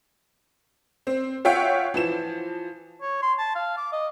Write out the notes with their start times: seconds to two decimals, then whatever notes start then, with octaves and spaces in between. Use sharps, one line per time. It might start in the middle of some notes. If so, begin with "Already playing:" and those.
1.07 C4
1.45 F4 C#5 E5 F#5 G5
1.94 E3 F3 E7
3.02 C#5
3.22 C6
3.38 A5
3.55 F5
3.77 D6
3.92 D#5